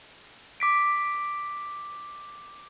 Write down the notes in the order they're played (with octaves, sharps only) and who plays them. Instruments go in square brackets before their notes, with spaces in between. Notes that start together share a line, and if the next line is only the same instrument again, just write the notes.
[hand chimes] D6 B6 D7